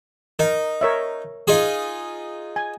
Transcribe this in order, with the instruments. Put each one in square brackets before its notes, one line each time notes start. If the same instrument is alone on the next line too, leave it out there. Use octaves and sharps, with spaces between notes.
[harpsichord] D#4 [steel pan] A#4
[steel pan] A#4 C#5 E5
[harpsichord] D#4 F4 G#4
[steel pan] G#5